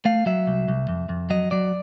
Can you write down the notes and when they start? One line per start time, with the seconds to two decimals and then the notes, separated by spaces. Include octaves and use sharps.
0.05 A3 F5
0.26 F#3 E5
0.47 C2
0.68 C2
0.88 F2
1.09 F2
1.30 F#3 D#5
1.51 F#3 D5